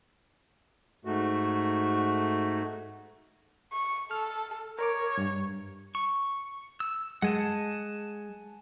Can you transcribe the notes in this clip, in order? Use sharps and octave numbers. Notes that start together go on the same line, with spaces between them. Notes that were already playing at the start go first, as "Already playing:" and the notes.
G#2 A3 F#4
C#6
A4 F6
A#4 C#5 D6
G2
C#6
E6
G#3 F#5 G#5 A5